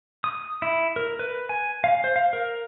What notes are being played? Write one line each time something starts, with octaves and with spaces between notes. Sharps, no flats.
D#6
E4
A#4
B4
G#5
F5
C5
F5
A#4